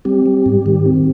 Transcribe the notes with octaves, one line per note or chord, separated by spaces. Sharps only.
G3 C4 G4
G3
G#2
D#3
C4